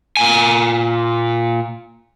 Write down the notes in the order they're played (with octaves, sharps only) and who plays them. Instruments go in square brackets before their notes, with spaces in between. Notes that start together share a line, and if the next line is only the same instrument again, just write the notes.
[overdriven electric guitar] A#2 G#5